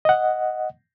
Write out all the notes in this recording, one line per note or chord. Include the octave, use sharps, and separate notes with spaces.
D#5 F#5